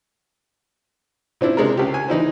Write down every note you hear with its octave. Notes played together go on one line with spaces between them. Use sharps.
A#2 C4 D4 E4
C3 G#3 D4 A#4
C#2 G4
G#5
E3 D#4 E4 C5